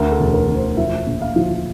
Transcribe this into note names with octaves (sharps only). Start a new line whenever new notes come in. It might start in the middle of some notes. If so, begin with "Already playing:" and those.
Already playing: D2 A#4
A4
E1
A#4
E1
C5
F3 E5
A#1
F5
F3